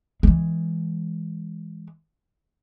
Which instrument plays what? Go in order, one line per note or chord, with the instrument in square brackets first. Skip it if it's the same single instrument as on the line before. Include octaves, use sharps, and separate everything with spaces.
[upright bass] E3 G#3